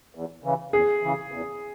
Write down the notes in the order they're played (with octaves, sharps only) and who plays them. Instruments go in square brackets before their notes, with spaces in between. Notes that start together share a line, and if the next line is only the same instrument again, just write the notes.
[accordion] E2
C#3 E3
[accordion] E2 [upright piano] G#4
[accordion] C#3 E3
E2